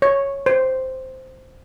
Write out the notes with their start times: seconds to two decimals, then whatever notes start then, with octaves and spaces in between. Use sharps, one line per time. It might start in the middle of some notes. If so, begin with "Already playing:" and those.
0.02 C#5
0.46 C5